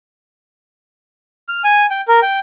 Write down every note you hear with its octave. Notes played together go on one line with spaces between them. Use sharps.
F6
G#5
G5
A#4
G5